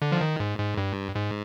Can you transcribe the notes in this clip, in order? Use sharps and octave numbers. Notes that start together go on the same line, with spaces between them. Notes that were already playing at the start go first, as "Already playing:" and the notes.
D3
F3
D#3
G#2
G#2
G2
G#2